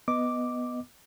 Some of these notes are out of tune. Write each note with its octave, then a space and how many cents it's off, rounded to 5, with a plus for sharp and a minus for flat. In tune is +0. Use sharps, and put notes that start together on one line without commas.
B3 +0 D#5 +0 D6 +0